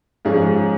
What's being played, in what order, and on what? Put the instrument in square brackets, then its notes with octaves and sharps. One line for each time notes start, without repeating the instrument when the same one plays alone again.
[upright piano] G#2 F3 C#4 G#4